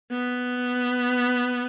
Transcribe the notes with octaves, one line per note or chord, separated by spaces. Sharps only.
B3